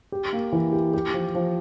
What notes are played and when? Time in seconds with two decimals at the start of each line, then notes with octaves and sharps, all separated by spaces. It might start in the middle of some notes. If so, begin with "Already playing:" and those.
0.12 G4
0.33 A#3
0.52 E3
0.73 G4
0.94 G4
1.14 F3
1.35 F3